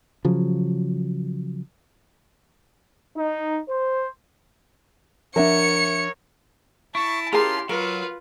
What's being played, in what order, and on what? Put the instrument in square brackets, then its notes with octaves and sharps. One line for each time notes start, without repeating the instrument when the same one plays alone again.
[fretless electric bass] C#3 F3 F#3
[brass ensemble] D#4
C5
[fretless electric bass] F3 D4 [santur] A#4 E5 F#5 [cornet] C#5 [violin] C#7
[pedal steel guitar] E4 [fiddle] A5 [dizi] C#6
[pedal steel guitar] C#4 F4 [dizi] E4 [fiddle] G4 C6 [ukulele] G#4 A#4 A5
[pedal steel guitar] F#3 [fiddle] F4 B4 [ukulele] A#4 [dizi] F5